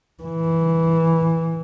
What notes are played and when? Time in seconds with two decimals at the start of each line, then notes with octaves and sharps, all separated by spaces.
0.23 E3